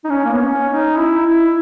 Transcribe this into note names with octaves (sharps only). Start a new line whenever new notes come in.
D#4
C#4
A#3
B3
C#4
D#4
E4
E4